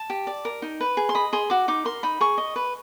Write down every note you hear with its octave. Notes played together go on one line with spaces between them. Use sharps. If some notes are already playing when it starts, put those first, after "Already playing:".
Already playing: A5
G4
D5
A#4
D#4
B4
G#4
C6
D#5 B5
G#4 C6
F#4 D6
D#4 D6
A#4 C6
D#4 B5
G#4 C#6
D#5
B4